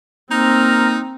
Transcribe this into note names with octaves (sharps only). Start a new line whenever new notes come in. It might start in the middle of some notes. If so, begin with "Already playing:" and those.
A#3 C4 D#4 A#5 F6